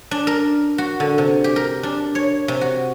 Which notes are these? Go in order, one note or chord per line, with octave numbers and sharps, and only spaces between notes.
D4
A#4
F#4
D3
C3
G4
A#4
D4
C#5
C3
F#4